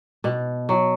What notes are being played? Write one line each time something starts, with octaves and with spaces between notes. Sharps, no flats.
B2
F#3